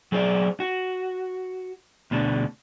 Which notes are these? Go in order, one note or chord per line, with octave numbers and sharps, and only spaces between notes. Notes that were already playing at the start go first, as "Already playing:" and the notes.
F#3 G#4 C5 D5
F#4
D2 B2 D4